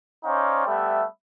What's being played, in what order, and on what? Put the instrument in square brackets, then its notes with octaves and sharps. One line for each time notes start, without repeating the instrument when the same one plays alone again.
[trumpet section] C#4 D#4 C5 D5 F5 G5
G3 A3 B3 E5